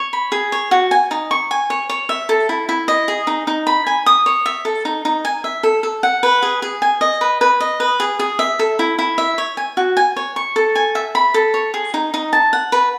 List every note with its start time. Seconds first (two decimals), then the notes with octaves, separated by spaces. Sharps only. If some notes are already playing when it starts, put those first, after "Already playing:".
Already playing: C#5
0.13 B5
0.32 G#4
0.52 C#5
0.71 F#4
0.91 G#5
1.11 D#4
1.31 C#6
1.51 G#5
1.70 C#5
1.90 C#5
2.09 E5
2.29 A4
2.49 E4
2.69 E4
2.88 D#5
3.08 G#4
3.27 D#4
3.47 D#4
3.67 B5
3.87 G#5
4.06 D#6
4.26 C#5
4.46 E5
4.65 A4
4.85 D#4
5.05 D#4
5.25 G#5
5.44 E5
5.63 A4
5.83 A4
6.03 F#5
6.23 B4
6.42 G#4
6.62 G#4
6.82 G#5
7.01 D#5
7.21 B4
7.41 B4
7.60 D#5
7.80 B4
8.00 G#4
8.19 G#4
8.39 E5
8.59 A4
8.79 E4
8.99 E4
9.18 E5
9.38 C#5
9.57 G#5
9.77 F#4
9.97 G#5
10.16 C#5
10.36 C#6
10.56 A4
10.75 G#5
10.95 E5
11.15 B5
11.34 A4
11.54 C#5
11.74 G#4
11.94 D#4
12.14 D#4
12.33 A5
12.53 F#5
12.72 B4